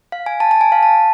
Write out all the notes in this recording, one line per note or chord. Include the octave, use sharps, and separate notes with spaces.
F5
G#5
A5
A5
G#5
F5
A5